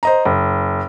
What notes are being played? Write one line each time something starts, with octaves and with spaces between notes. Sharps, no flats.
C5 D#5 A#5
F#1